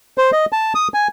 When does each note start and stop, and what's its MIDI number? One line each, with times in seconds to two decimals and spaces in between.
0.18 0.31 72
0.33 0.45 75
0.52 0.73 81
0.75 0.88 87
0.94 1.08 80